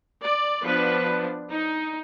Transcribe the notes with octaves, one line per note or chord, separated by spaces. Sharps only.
D5
F3 B3 D4 B4
D#4